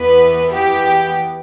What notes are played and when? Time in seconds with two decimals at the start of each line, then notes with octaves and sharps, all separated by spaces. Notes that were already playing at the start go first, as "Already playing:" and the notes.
Already playing: E2 E3 B3 B4
0.52 G4